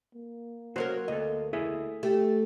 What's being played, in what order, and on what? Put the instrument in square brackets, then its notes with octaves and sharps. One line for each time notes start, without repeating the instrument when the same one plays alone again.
[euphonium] A#3
[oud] F#3 C#4 A#4 [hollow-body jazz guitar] F#4 C5
[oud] D2 [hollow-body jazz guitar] A4 D#5
[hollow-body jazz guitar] E4 G#4 E5
[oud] A3 [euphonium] G4